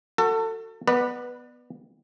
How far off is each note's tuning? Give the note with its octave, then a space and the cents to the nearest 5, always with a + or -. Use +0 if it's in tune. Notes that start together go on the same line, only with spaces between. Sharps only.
F#4 +0 A4 +30
B3 +0 B4 -10 D5 +30